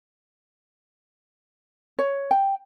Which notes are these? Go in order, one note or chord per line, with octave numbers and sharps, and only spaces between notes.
C#5
G5